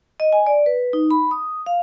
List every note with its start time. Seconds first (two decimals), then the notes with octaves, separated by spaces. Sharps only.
0.20 D#5
0.33 G#5
0.47 D5
0.66 B4
0.93 D#4
1.11 B5
1.31 D#6
1.66 F5